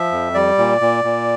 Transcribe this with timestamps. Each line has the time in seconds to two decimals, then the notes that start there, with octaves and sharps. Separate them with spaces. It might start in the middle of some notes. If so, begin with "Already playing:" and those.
Already playing: F3 E5
0.11 F2
0.34 G3 D5
0.58 A#2
0.81 A#2
1.04 A#2